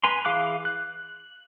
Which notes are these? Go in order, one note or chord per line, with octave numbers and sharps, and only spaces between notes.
B4 G#5 A#5 C6
E3 G#4 F5 D6 F#6
F#6